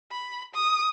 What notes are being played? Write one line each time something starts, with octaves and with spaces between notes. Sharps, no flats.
B5
D#6